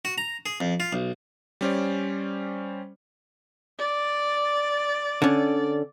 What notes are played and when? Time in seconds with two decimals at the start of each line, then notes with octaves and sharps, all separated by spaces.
0.05 F#4
0.18 A#5
0.46 G#4
0.60 F2
0.80 F4
0.93 B1
1.61 G3 C#4 C5 D5
3.79 D5
5.22 D3 C#4